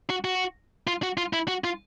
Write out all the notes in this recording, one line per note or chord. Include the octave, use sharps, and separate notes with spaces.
F#4
F#4
F4
F#4
F4
E4
F#4
F4